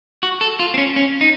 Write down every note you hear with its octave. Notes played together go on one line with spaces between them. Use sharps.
F#4
A4
F4
C4
C#4
C#4
D#4